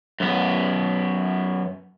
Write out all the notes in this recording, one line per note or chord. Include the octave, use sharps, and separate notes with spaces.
F#2 B3